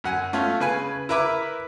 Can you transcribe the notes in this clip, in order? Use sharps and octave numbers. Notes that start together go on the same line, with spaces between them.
F#2 F#5 G#5
A3 C#4 F4
C#3 B4 G#5
E4 A#4 B4 E5 D6